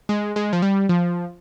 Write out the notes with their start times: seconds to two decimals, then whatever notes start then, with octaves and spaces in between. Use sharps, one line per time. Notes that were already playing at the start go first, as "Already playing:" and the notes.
0.09 G#3
0.36 G#3
0.53 F3
0.62 G3
0.89 F3